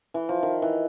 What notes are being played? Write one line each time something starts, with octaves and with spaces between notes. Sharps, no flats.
E3
F3
D#3
E3